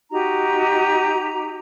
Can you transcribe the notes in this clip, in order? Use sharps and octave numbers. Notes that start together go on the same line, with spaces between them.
D#4 F#4 G4 A#5